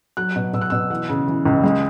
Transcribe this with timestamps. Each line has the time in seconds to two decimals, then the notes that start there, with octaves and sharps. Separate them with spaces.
0.17 F#3 F#6
0.36 B2
0.53 B2 E6
0.61 F#6
0.70 B2 E6
0.90 E3 F#5
1.09 C#3
1.28 E3
1.46 C#2
1.64 G#3